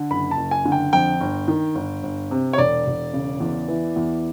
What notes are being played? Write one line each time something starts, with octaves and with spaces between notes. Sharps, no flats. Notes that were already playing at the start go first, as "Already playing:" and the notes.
Already playing: D3
F#1 B5
A5
F#1
G#5
D3
G5
F2 G5
G1
D#3
G1
G1
C3
C#5
E1 D5
E1
C#3
E2
E3
E2